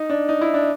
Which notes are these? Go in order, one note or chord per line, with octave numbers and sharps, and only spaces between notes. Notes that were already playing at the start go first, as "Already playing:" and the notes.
Already playing: D#4
D4
D#4
E4
D4